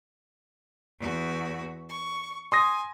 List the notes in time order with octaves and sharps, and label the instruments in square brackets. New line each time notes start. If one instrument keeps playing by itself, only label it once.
[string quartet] E2 F#4
C#6
[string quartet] G#5 [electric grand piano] C6 D#6 A#6